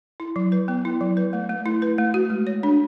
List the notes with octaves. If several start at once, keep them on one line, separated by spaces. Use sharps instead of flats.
E4
F#3
B4
B3
E4
F#3
B4
A3
A3
E4
B4
A3
F#4
G#3
C#5
D4